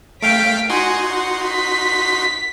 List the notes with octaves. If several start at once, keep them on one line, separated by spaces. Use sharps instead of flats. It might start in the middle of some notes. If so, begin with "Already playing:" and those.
A3 F5 G5 B6 D7
D#4 F#4 F#5 G#5 C6
F#5
B6